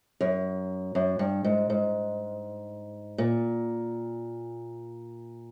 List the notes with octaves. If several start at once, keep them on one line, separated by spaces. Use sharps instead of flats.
F#2
F#2
G2
G#2
G#2
A#2